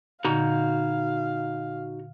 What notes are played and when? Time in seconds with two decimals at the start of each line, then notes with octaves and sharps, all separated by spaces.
0.25 A#2 D3 D#4 F#4 F5 A#5